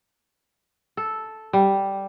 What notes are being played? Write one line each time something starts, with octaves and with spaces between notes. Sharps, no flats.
A4
G3